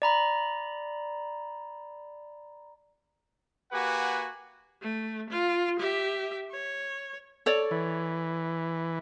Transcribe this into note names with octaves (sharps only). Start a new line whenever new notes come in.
D5 A#5 B5
A#3 F#4 G4 B4 F#5 G#5
A3
F4
G4 E5
C#5
A4 C#5 D5
E3